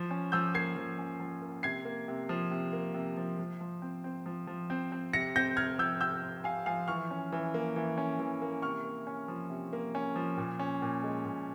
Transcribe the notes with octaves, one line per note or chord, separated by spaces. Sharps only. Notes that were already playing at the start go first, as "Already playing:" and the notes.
Already playing: F3
C#4
F3 E6 G6
A#3 G#6 C7
F3
C#4
F3
A#3
C3 G#6 C7
A#3
C3
F3
C3
A#3
C3
F3
F3
F3
C4
C4
F3
F3
C4
C4
C3 A#6 C#7
C4 G6 A#6
C3 F6 G#6
F3 E6 G6
C3 E6 G6
C4
C3 F5 G#5
F3 F5 G#5
E3 C#6 F6
C#4
E3
A#3
E3
C#4
E3
A#3
C3 C#6 F6
A#3
C#4
F3
C3
A#3
C#4
F3
A#2
C#4
A#2
G#3
A#2